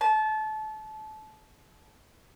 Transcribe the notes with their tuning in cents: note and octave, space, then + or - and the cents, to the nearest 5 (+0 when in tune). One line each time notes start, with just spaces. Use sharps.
A5 -25